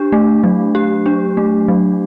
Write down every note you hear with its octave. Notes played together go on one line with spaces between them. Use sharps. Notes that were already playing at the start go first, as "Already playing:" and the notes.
Already playing: D4 G4
A3
F#3
G4
D4
A3
F#3